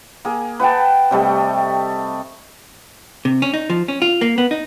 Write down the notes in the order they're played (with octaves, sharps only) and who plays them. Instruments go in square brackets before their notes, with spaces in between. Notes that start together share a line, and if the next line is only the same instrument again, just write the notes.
[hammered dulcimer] A#3 G#4
B4 F#5 G5 A5
C3 G3 A3 D#5
[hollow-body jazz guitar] C3
C#4
D#4
F3
C#4
F4
A#3
B3
D#4